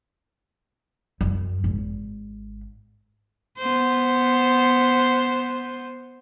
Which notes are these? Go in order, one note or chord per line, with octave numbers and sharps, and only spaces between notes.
F#2
G#1
B3 C5